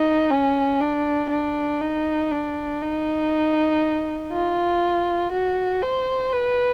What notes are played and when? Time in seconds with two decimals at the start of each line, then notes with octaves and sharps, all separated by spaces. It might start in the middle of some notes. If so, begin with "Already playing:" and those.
Already playing: D#4
0.31 C#4
0.81 D4
1.30 D4
1.81 D#4
2.32 D4
2.82 D#4
4.32 F4
5.32 F#4
5.83 C5
6.33 B4